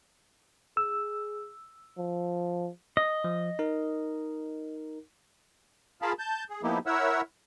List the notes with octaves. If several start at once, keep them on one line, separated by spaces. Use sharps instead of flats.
G#4 E6
F3
D#5
F3
D#4 A#4
F4 G#4 A#4 F5 A5 B5
A5 G6
G#4
F3 A#3 B3 D#4 E4 G4
E4 A#4 C#5 E5 F#5 E6